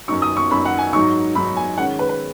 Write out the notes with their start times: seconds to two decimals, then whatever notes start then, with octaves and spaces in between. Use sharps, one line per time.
0.08 F#2 F#3 D#4 C#6
0.22 D#6
0.37 C#6
0.51 F#2 F#3 D#4 B5
0.65 F#5
0.78 G#5
0.92 G#2 F#3 D#4 C#6
1.35 G#2 F#3 D#4 B5
1.57 G#5
1.78 D#3 G#3 C#4 F#5
1.99 B4
2.09 B4